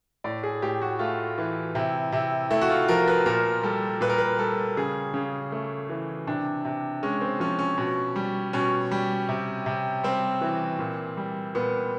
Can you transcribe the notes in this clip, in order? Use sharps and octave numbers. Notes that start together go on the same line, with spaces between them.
A2 D5
G#4
A2 G4
F#4
A3 F4
E3
C3 E4
C3 E4
A3 E4
F#4
F4
F3 A#4
B4
A#2 A#4
G3 A4
A#2 B4
A#4
B4
G3 A4
C#3 G#4
C#3
A3
E3
C3 D4
C3
G#3 C#4
C4
F3 C#4
C#4
B2
G3
B2 C#4
G3
C3
C3
G3 C4
E3
A#2
G3
A#2 B3